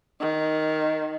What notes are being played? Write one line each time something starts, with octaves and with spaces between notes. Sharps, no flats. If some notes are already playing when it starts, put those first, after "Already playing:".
D#3